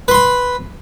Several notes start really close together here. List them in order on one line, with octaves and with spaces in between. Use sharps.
B4 C6 B5